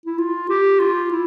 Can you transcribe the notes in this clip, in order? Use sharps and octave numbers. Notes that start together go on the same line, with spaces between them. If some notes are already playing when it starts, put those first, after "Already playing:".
E4
F4
G4
F4
E4